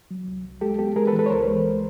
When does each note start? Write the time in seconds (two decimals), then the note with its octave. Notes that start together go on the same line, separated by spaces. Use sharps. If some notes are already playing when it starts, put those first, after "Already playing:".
0.11 F#3
0.28 C2
0.44 C2
0.61 G#3 G4 A4
0.79 B3 G4 A4
0.96 G#3 G#4 A#4
1.07 A4 B4
1.13 E3
1.19 A4 B4
1.26 C#5
1.30 C#2 A#4 C5
1.47 G#3
1.64 C#2